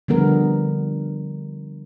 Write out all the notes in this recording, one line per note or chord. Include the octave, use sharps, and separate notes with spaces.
D3 F3 G3 B3 A#4